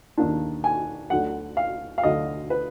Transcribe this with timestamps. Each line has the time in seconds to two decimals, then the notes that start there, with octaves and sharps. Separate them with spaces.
0.17 D#2 D#3 A#3 D4
0.64 G#5
1.10 D2 D3 F#3 F#5
1.57 F5
1.98 F5
2.03 D2 D3 F#3 D#5
2.50 B4